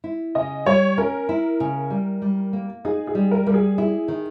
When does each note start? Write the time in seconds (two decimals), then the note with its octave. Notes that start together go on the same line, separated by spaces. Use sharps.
0.04 E4
0.35 C#3 D#5
0.66 G3 C#5
0.98 C#4 A#4
1.29 E4
1.60 C#3
1.90 G3
2.22 G3
2.53 A#3
2.85 D#4 G#4
3.07 G#4
3.15 G3
3.31 A#4
3.47 G3 A#4
3.54 G#4
3.78 E4 G#4
4.08 D#3